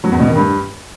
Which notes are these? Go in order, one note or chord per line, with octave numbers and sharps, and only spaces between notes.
F#3
E2
B2
D#3
G2